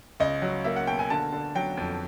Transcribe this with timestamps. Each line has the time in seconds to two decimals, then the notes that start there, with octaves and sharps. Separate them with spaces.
0.20 C#2 D#5
0.42 F#3
0.65 A#3 E5
0.76 F#5
0.87 B2 G5
0.99 G#5
1.10 D3 A5
1.33 D3
1.55 F#3 G5
1.77 F2